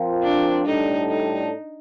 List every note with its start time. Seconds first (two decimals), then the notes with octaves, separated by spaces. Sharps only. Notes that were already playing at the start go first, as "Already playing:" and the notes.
Already playing: F3 C4 F4 A#4
0.23 D4
0.66 A2 G3 D4 D#4 A4
1.09 D#4